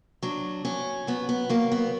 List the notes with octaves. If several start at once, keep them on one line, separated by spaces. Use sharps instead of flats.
F#3 D4
F#3 C#4
F#3 B3
B3
F#3 A#3
B3